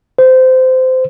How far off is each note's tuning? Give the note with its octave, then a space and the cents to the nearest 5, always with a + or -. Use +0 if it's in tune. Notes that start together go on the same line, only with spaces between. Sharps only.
C5 -20